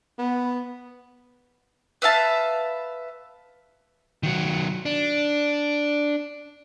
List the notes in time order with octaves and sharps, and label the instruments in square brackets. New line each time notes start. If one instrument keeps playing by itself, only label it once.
[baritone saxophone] B3
[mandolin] B4 E5 F5 A5
[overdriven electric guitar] D#3 F#3
D4